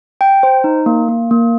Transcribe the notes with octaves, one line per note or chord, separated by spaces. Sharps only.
G5
C5
D#4
A#3
A#3
A#3